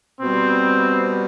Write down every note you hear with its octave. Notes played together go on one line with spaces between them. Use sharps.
B2 G3 C4